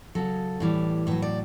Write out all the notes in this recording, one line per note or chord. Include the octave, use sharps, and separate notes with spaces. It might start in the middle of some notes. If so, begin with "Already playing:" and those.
C#3 F#3 A4
A2 E3 G3
A2 F#3 B4
D5